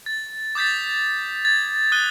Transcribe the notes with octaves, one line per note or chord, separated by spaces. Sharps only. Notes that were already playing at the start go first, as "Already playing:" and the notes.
A6
D6 D#6 G6 A6 B6
G#6 A6
D#6 F#6 D#7 G7